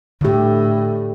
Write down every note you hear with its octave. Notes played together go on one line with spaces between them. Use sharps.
A2 D3 G4